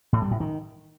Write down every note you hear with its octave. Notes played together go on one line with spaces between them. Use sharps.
A2
G3
A2
D#3